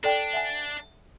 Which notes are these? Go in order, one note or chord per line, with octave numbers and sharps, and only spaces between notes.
D4 A4 D5 G5
E5 F#5 G#5